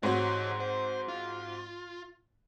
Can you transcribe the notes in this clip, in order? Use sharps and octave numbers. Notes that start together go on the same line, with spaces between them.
G#2 C4 F#4 G4 C#5
C5
F4